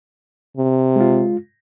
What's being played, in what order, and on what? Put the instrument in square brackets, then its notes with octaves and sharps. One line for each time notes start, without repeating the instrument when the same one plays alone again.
[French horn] C3
[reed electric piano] G#3 F4